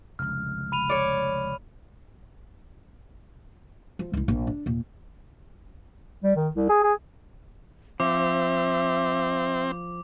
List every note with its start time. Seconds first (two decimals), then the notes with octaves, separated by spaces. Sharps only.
0.19 F1 C#2 F6
0.72 B5 D#7 F7
0.89 C#5 D5
3.99 F3
4.13 C#2 E4
4.28 A#1
4.47 D4
4.66 D#2 A#2
6.24 G3
6.36 D#3
6.54 C2
6.69 G#4
6.83 G#4
8.00 F3 C4 E5 D6